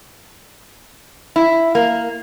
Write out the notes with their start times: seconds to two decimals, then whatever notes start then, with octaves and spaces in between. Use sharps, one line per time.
1.36 E4
1.75 A#3